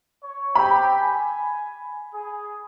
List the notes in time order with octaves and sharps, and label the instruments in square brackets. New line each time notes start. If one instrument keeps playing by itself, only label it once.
[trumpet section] C#5
[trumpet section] C4 G4 [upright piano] B5
[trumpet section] G#5
G#4